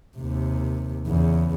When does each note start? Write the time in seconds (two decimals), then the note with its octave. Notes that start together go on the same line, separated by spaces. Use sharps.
0.17 D#2 C3
1.07 E2 C#3